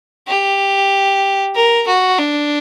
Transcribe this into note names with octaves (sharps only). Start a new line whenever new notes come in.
G4
A#4
F#4
D4